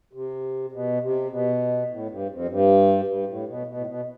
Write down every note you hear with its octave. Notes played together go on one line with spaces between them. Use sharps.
C3
B2
C3
B2
A2
G2
F2
G2
G2
A2
B2
B2
A2
B2